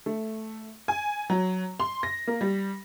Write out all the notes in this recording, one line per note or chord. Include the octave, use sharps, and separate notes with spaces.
A3
G#5
F#3
C6
A#6
A#3
G3